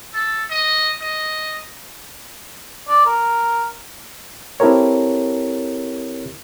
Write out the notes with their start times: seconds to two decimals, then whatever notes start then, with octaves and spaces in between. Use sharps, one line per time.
0.14 A4
0.50 D#5
1.02 D#5
2.88 D5
3.06 A#4
4.60 C4 E4 G4 A4 A#4 C#5